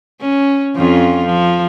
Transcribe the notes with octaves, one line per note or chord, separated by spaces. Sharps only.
C#4
F2 C#4 F4
F3